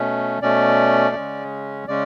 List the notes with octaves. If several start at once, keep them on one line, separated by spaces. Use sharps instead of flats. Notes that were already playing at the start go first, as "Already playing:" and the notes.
Already playing: B2 A3 C#4
B2 A3 C#4 D5
C#3 G#3 C#4
C#3 G#3 C#4 D5